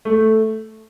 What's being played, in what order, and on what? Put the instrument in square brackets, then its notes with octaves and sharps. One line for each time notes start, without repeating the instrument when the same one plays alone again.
[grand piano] A3